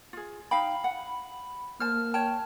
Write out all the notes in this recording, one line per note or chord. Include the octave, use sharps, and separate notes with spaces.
F4 G#4
D#4 F5 G5 B5
F#5
A#3 C5 A5 F6
C#5 G5 A5